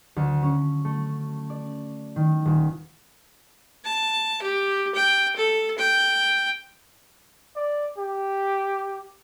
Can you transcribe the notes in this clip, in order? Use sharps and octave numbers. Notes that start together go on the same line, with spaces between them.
D2
C#4
A3
D5
D#3
D#1
A5
G4
G5
A4
G5
D5
G4